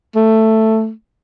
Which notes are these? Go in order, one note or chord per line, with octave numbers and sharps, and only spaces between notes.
A3